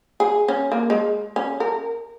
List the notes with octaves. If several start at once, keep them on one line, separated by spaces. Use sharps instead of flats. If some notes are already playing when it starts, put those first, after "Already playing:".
G#4
C#4
A#3
G#3
C#4
A#4